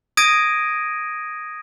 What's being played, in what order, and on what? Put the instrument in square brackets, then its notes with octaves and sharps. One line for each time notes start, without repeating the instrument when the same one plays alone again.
[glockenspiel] D#6 G#6 A#6 D7 D#7